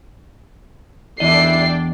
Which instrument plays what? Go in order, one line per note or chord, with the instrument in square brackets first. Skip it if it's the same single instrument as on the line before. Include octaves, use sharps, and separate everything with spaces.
[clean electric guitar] E2 D#5 [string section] D4 D5 G5 [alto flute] E4 [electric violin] C7